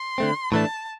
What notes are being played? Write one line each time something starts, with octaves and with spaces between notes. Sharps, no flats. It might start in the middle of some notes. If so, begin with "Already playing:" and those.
Already playing: C6
D3 A3 C4
A2 E3 A3 D4 A5